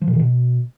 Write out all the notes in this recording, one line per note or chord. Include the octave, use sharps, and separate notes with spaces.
F3
B2
E3
B2